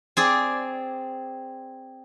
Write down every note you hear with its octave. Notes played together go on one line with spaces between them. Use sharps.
C4 G#4 D5